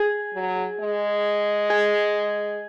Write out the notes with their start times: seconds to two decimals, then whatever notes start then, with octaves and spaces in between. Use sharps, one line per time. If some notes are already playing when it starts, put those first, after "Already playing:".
Already playing: G#4
0.34 F#3
0.80 G#3
1.70 G#4